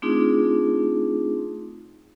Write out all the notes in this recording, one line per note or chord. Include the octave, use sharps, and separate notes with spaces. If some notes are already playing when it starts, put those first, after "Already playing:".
A3 C4 D4 D#4 F4 G#4